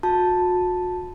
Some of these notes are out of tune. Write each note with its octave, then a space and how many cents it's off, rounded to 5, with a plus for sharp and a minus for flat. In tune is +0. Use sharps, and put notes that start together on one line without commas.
F#4 -40 A5 +0